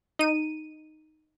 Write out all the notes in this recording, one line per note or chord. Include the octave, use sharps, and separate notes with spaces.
D#4 D#7